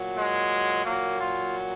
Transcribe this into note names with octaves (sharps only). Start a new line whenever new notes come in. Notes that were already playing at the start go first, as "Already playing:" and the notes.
Already playing: A#2 F#3
G#3
A#2 F#3 A#3
F4